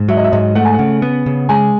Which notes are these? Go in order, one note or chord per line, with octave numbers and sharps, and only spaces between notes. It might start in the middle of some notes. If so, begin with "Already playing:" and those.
Already playing: G#2
F#3 E5
D#5
E5
G#2 D#5
A3 F#5
G#5
C#3 F#5
B3
C#3
G#3 G#5